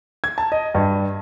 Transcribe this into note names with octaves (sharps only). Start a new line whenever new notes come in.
G#6
A5
D#5
G2